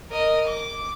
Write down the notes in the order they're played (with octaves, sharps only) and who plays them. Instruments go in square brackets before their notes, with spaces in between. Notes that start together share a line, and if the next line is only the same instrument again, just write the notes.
[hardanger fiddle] A#4 D#5
D6